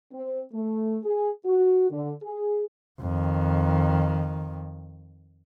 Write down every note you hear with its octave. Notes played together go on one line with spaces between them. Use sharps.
C4
A3
G#4
F#4
D3
G#4
F2 D#3